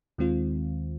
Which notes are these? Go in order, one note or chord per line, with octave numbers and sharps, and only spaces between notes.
D#2 D#3 G#3 C4 F4